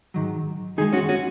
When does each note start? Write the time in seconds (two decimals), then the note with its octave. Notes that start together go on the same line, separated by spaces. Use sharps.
0.14 G#2 D#3 F#3
0.77 F#2 D#3 G#3 D#4 G#4
0.93 C#4 F#4
1.09 C#4 F#4